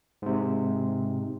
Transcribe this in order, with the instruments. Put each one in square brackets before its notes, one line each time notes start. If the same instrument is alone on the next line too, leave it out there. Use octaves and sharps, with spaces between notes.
[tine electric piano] G#2 C3